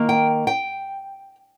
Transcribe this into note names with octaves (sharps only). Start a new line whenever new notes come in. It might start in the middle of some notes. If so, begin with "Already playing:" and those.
Already playing: D#3 A#3
G5
G5